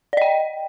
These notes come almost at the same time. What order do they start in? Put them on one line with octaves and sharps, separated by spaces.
D5 D#5 G5